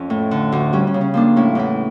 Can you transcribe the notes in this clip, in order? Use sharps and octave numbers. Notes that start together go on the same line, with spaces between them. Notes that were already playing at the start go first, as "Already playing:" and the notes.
Already playing: F2 C#4
A2
D3
D2
G3 C#4
C#4
C#3
C#4
F3 A#3 D4
A2 C#4 E4
E2 C#4 E4